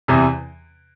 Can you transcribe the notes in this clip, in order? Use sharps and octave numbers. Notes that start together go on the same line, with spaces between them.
E2 C3 E3